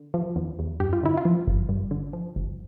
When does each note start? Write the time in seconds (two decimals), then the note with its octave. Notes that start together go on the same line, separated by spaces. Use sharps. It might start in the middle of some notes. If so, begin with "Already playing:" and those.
Already playing: D3
0.14 F3
0.36 E2
0.59 E2
0.80 G2 G4
0.93 F4
1.03 D3 E4
1.17 F4
1.25 F3
1.47 G1
1.69 G2
1.91 D3
2.13 F3
2.36 G1